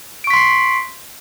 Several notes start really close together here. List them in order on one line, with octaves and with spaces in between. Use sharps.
D7 C#6 B6 C6 C7